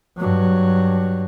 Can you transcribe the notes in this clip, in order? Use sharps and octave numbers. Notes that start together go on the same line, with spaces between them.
G2 F#3